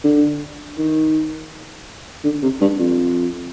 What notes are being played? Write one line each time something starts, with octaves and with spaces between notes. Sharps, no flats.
D3
D#3
D3
C3
G2
F2